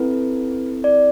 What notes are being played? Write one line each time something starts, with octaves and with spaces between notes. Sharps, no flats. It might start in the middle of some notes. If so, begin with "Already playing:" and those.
Already playing: C4 E4 A4 B4
D5